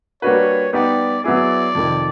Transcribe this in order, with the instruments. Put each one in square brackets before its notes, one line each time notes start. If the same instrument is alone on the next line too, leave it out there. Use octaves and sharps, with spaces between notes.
[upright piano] G3 A#3 D4 F#4 B4 [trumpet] C#5
[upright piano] G3 B3 D#4 G4 [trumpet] D5
[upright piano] F#3 B3 E4 G#4 [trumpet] D5
[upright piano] F2 C3 D#3